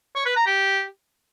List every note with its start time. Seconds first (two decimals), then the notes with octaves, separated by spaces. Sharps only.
0.15 C#5
0.26 B4
0.36 A#5
0.46 G4